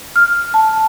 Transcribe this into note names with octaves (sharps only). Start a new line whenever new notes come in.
F6
A5